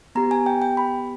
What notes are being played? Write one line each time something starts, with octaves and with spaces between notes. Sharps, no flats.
B3 G4 A#5
G#5
G5
G5
B5